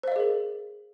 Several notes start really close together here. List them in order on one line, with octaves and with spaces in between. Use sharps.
C5 F5 D#5 G#4 A#4